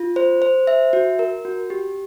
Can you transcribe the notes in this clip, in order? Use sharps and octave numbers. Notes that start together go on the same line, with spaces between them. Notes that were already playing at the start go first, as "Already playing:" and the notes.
Already playing: F4
C5
C5
E5
F#4
A#4
F#4
G4